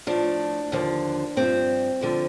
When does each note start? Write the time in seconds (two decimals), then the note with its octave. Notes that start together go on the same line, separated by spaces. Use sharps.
0.07 A2 F3 D4
0.72 D#2 D3 F3
1.37 G2 F3 C4
2.01 D2 D3 F3